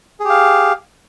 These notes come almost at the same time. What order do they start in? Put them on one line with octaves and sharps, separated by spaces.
G#4 G4 F5